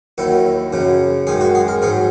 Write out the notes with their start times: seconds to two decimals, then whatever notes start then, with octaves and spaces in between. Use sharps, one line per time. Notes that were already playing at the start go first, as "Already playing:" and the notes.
0.18 D#2 D#3 F#3 E4
0.73 F#2 C#3 F#3
1.27 F#2 D#3 G#3 G#4
1.41 F#4
1.55 G#4
1.68 A#4
1.82 G#2 F#3 G#4